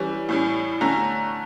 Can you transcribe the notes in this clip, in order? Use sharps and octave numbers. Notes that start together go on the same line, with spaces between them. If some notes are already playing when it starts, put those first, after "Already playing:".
Already playing: E3 G3 C#4
A2 G3 C#4
D3 A3 C#4 A#5